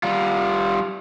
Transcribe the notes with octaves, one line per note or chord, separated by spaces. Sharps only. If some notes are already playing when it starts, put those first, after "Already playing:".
G3 F4